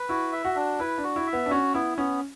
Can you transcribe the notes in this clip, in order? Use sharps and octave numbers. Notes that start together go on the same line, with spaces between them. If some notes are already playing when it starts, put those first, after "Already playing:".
Already playing: B4
E4 F#4
E5
F#4
D4
E4 B4
D4
F#4
E4
E5
B3
D4
C#4 F#4
B3 E4
B3 C#4